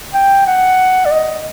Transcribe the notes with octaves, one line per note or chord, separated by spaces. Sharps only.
G5
F#5
D5
D#5